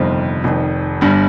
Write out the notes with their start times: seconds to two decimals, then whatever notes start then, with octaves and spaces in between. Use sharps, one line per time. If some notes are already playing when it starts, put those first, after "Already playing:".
Already playing: G1 F2 C3 D#3 G3 C5
0.44 F1 F2 D#3
1.01 G1 G2 G3